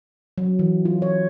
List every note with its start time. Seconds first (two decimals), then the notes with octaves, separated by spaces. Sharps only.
0.38 F#3
0.59 E3
0.85 F4
1.02 C#5